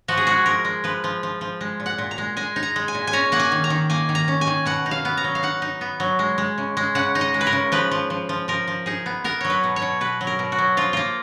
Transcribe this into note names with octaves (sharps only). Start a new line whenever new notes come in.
F3 F#4
G#4
G#3 F#4
F3 A#4
G#3
F3 B4
F3
F3
F3
G#3
A#2
F#5
A#2
A#5
G#3
G#3 G#5
D#4
A#5
G#3
G#5
A#2
G#5
C#4 A#5
A#3 F#5
G#5
D#3
A#5
D#3
A#3 G#5
D#3
A#5
C#4
G#5
D#3
B2 F#5
D#4
F5
B3
A#5
F#3
F5
D#4 F#5
D#4
B3
F#3
G#3
G#3
C#3
G#3
C#3 F#5
D#4
D#5
G#3
B4
A#4
C#3
F3 B4
F3
F3
F3
F3 A#4
F3
D#4 G#4
B3
B3 A#4
F#3 C#5
B4
B2
C#5
B2
B2 B4
F#3
A#4
B2
F#4
F#3
F3 F4
A#3 F4